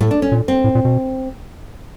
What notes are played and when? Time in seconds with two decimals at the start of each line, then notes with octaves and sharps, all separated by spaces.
0.01 A2 A3
0.11 D4
0.22 C#4
0.32 A#2
0.48 C4
0.64 A2
0.75 A#2
0.85 B2